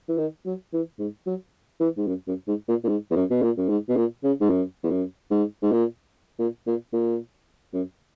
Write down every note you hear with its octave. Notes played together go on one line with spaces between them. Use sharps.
E3
D#3
F#3
E3
G#2
F#3
E3
G#2
F#2
F#2
G#2
A#2
A#2
G#2
E2
F#2
B2
A#2
F#2
G#2
B2
A#2
C#3
G#2
F#2
E2
F#2
G#2
G#2
A#2
A#2
A#2
A#2
F#2